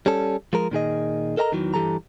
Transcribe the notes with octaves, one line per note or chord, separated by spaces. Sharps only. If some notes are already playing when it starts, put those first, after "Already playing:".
G3 C#4 A4
F3 G#3 A#4
A#2 D#3 G#4 D#5
A4 A#4 D#5 A5 A#5
E2 D#3 E3 F#3
G2 E3 G4 A4 A#5